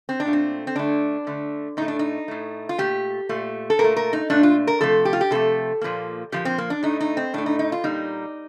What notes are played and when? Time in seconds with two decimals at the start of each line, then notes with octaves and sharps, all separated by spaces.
0.09 C4
0.20 D4
0.25 A#2 A3
0.33 C4
0.67 C4
0.76 D3 A3 D4
1.27 D3 A3
1.77 A2 A3 D#4
1.88 D4
1.99 D#4
2.28 A2 A3
2.69 F4
2.78 A#2 A3 G4
3.29 A#2 A3
3.70 A4
3.79 A#2 A#4
3.84 A3
3.96 A#4
4.13 D#4
4.30 A#2 A3 D4
4.43 F4
4.67 A#4
4.81 C3 F3 A3 A4
5.05 G4
5.13 F4
5.21 G4
5.31 C3 F3 A3 A4
5.81 A#2 F3 A#3
6.32 A#2 F3 A#3 G4
6.45 C4
6.58 A#3
6.70 D4
6.83 A2 A3 D#4
7.00 D#4
7.17 C4
7.34 A2 A3 D4
7.46 D#4
7.59 D#4
7.72 F4
7.84 A#2 G3 A#3 D#4